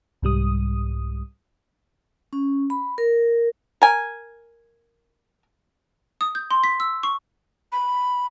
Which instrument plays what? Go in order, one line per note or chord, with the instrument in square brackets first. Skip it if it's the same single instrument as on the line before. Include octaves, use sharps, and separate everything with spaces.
[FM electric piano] C2 G#2 G3 D#6
[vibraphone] C#4
B5
A#4
[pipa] A#4 G#5
[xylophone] D#6
G6
C6
B6
E6
C#6
[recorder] B5